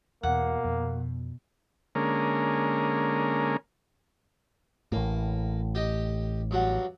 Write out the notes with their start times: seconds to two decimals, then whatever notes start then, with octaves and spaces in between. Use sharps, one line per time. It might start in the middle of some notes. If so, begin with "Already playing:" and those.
0.23 E2 B2 A#3 F#5
0.64 F2
1.95 D3 G#3 A#3 C#4 A#4
4.92 A1 A2 A#3
5.75 G4 D#5
6.51 G2 F#3 F#5